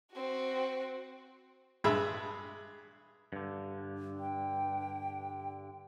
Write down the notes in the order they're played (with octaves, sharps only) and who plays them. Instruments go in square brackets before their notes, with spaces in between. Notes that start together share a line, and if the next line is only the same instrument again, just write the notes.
[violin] C4 F#4
[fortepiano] G2 G#3 G#4 E5 B5
[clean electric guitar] G2 D3
[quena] G5